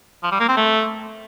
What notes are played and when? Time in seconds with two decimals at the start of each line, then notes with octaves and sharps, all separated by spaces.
0.23 F3
0.32 G3
0.40 A#3
0.49 C4
0.57 A3